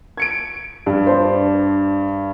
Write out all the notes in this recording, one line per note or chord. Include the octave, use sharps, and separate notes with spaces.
G#6 C#7 D7
G2
D4 C5